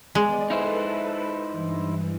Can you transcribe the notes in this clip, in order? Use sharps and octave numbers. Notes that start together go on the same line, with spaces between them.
G#3 B3 D5
D#4 E4 A4 B4 C5
G2 E3